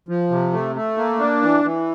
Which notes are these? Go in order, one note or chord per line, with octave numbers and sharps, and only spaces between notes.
F3
C3
A3
A3
A#3
D4
E3
E3